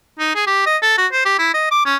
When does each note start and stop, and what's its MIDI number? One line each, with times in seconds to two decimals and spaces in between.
0.19 0.34 63
0.36 0.43 68
0.47 0.66 67
0.66 0.77 75
0.82 0.95 69
0.98 1.07 66
1.12 1.25 72
1.25 1.39 67
1.39 1.52 64
1.54 1.71 75
1.71 1.85 86
1.86 1.97 61